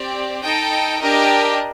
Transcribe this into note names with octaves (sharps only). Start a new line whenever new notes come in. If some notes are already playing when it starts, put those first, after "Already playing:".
Already playing: C4 G4 D5
D#4 A4 D#5 G5
D4 G4 A#4 D#5